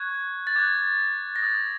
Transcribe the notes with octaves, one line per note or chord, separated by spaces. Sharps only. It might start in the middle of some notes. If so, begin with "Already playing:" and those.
Already playing: C#6 F#6 G#6
A6
D6 F#6 G#6
A#6
D#6 F#6 A6